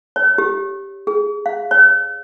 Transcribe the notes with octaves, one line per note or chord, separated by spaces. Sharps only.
C#5
G4
G#4
F5
C#5